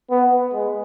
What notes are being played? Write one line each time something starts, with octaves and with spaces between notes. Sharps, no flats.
B3
G#3